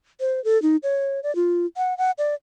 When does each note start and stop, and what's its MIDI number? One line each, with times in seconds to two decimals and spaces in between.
0.20 0.42 72
0.44 0.61 69
0.62 0.76 63
0.83 1.20 73
1.23 1.34 74
1.36 1.66 65
1.77 1.97 78
1.98 2.11 78
2.18 2.34 74